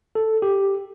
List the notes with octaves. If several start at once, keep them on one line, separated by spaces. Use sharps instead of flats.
A4
G4